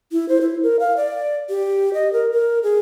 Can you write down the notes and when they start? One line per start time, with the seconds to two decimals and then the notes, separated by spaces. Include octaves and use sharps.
0.12 E4
0.29 C5
0.41 E4
0.63 A#4
0.80 F5
0.97 D5
1.50 G4
1.94 D#5
2.13 A#4
2.32 A#4
2.63 G#4